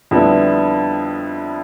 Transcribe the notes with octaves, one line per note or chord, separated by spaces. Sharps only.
F2 D3 G3 B3 E4